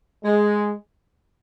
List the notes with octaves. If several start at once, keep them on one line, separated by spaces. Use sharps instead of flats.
G#3